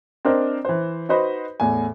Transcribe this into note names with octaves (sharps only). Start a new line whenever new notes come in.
C4 D4 A#4 C5 D#5
E3 C5
D#4 F#4 B4 C5 D#5 B5
E2 A2 G#5